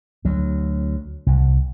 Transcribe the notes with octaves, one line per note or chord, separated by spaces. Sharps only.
D2 F#3
C2